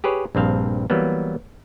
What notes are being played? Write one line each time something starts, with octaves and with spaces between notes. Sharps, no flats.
G4 G#4 B4 C#5
A#1 G2 C4 F5
E3 F#3 G3 A#3 B3